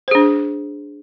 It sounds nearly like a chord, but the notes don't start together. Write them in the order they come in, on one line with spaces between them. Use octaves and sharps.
C5 G#4 D4